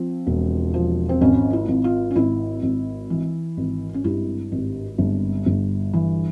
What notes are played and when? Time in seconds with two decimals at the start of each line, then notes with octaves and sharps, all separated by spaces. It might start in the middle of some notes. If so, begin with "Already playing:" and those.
Already playing: F3 C4
0.27 E1
0.74 F3
1.09 C4
1.21 G#1 C#4
1.53 E4
1.68 G#1
1.84 F4
2.11 C#4
2.16 G#1 E4
2.63 G#1
3.10 E3
3.57 G#1
3.94 C#4
4.04 G2 E4
4.52 G#1
4.98 G1
5.46 G1
5.93 E3